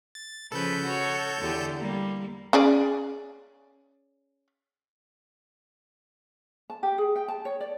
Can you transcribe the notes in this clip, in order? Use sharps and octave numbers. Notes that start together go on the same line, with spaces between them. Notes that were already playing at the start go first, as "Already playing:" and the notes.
A6
C#3 F3 A4 B4 G6
F#4 C#5
E2 D3 G4
G3 A#3
C#4 G#4 D5
A5
G4
G#4
G5
A5
C#5
D5